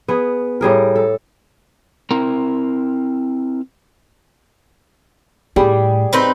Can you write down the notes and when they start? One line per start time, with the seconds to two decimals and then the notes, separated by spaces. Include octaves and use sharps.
0.08 B3 G#4
0.61 A2 G3 G#4 A#4
0.96 A4
2.11 C4 E4 A#4 A#5
5.56 A2 G3 G4 G#4 B5
6.13 C4 D#4 B4